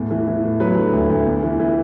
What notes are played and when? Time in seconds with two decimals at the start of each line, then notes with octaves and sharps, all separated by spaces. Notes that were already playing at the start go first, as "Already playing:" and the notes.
Already playing: E2 A2
0.11 E3
0.27 E3
0.43 A2
0.60 F#3 B4
0.77 D3
0.93 D2
1.10 D2
1.26 E2
1.43 E3
1.60 E3